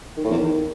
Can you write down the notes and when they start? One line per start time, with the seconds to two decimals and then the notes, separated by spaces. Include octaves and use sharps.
0.17 D#3
0.24 A2
0.31 E2
0.38 D#3